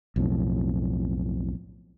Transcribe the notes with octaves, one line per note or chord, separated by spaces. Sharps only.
B1 F2 A2